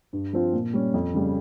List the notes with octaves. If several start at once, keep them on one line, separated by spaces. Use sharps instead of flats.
G2
F3 C4 F4
A#2
G3 C#4
F2
C#3 G3